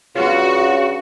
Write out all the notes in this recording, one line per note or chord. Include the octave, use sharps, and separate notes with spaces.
G2 C#3 F4 F#4